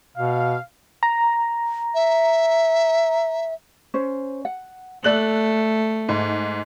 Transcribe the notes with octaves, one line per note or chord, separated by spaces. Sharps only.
B2 F5
A#5
E5
C#4 C5
F#5
A3 A4 D5 F#6 F#7
G#2